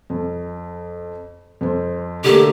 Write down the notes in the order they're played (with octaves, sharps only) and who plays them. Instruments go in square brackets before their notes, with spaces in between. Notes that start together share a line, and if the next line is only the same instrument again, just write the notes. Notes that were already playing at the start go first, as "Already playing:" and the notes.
[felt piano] F2
F2 C5
[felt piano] D3 A3 A#3 [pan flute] G4